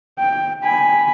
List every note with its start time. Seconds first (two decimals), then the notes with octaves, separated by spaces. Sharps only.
0.19 G5
0.64 G#5 B5